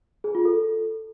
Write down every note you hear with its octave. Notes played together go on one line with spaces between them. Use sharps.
G#4
F4
A4